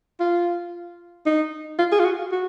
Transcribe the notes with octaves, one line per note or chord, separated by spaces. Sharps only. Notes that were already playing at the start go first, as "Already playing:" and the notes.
F4
D#4
F4
G#4
F4
F#4
F#4